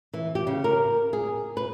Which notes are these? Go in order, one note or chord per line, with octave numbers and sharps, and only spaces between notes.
E3
G4
C#3
A#4
G#4
B4